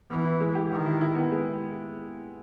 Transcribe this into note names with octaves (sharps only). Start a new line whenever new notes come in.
E3 B3
E4
G#3
G4
D#3 G4
E4
E4
B3
G#3